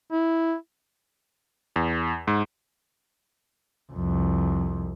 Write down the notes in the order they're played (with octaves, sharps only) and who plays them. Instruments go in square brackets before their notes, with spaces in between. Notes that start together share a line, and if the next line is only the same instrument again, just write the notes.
[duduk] E4
[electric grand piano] E2
G#2
[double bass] C2 F2